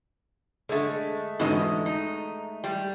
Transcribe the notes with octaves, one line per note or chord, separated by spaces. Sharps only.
D3 G#3 A3
E2 G#2 B2 D3 D#5
D#4
G3